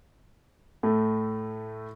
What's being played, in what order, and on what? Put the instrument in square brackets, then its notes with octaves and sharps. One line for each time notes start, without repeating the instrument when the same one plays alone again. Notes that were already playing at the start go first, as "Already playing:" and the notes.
[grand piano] A2 A3